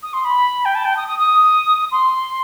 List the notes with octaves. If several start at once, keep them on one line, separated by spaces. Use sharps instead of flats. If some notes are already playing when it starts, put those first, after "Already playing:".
D#6
C6
B5
G5
A5
G5
D#6
D#6
D#6
C6